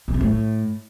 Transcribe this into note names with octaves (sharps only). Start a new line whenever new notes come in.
B2
C3
A2